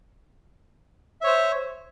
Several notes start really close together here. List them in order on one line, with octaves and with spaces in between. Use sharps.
E5 C#5 C5